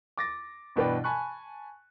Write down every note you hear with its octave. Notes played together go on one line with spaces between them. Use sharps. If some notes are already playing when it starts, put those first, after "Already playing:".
D6 A6 A#6
G2 B2 E3 B4 D5 G5
G#5 A5 B5 C#6 F#6